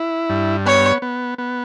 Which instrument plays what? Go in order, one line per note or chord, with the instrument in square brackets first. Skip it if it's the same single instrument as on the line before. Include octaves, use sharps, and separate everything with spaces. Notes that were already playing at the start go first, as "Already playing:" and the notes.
Already playing: [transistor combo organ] E4
G2
[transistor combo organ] B3 [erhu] C#5
[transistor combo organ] B3
B3